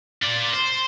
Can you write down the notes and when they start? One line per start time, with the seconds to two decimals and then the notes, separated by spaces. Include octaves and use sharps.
0.23 F4 D5
0.54 C5